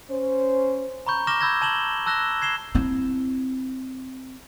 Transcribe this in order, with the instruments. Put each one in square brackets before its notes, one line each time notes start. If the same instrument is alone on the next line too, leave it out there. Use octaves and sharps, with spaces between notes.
[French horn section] C#4 C5
[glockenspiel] A#5 B5 C#6 G6
C#6 D6 F6 A#6 E7 G7
B5 E6 G6 G#6 A#6
A5 E7 F#7 G7
A5 E6 F#6 A#6 E7 G7
G#6 C7 E7 G7
[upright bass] C4 E4